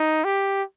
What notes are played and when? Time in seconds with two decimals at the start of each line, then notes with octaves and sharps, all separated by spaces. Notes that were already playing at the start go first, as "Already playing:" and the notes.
Already playing: D#4
0.24 G4